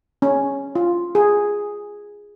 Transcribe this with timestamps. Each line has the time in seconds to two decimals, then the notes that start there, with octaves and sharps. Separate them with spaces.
0.22 C#4
0.75 F4
1.15 G#4